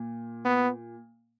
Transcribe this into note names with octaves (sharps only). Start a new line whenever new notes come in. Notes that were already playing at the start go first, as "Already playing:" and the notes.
Already playing: A#2
B3